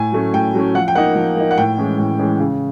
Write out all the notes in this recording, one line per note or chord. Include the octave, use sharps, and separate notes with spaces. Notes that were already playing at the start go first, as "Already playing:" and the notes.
Already playing: A2 G#5
F#3 A3 C#4
A2 G5
F#3 A3 C#4
F3 F#5
G5
A#3 D#4 F#5
F3
A#3 D#4
F#5
A2 G5
E3 G#3 C#4
A2
E3 G#3 C#4
C#3